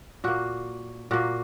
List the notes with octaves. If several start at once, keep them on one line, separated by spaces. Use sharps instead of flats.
A#2 A#3 F#4
A#2 A#3 F#4